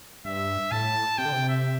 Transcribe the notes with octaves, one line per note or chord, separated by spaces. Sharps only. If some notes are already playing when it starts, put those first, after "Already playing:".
G2 E5
A2 A5
C3 G5
D3
C3
E5